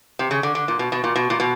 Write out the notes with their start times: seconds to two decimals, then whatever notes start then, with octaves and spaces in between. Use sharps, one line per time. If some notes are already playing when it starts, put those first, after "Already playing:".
0.19 C3
0.31 C#3
0.43 D3
0.55 D3
0.68 A#2
0.79 B2
0.92 B2
1.04 A#2
1.16 B2
1.30 A#2
1.40 B2